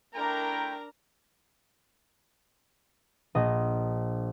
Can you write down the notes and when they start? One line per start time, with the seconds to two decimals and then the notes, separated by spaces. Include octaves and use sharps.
0.15 A3 D4 E4 A#4 G5 A#5
3.35 A#1 D#5 A#6